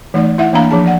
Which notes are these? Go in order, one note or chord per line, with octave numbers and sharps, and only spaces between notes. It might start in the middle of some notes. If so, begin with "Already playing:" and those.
E3 A3 D#4 D5
E4 E5 F#5
E3 A#3 D4 F5 A#5
F3 D4 G#4 A5
D5 F#5